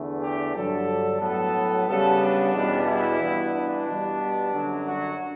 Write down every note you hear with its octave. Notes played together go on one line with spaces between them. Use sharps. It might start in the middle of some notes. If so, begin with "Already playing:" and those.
Already playing: E2 D3 A3
G4
G2 D3 F#3 A4
A2 F#3 B3 A4
C#3 G3 B3 A4
D4
E2 B2 G3 B3
E4
G2 E3 B3
D4
B2 G3 B3
F#2 D3 F#3
F#4